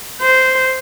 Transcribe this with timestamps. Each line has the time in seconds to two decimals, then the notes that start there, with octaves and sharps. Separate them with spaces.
0.22 C5